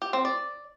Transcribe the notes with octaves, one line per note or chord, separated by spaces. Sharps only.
G4
C4
D5